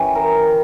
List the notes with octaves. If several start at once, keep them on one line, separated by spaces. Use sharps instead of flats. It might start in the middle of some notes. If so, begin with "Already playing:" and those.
Already playing: E3 C#4 G4
A#4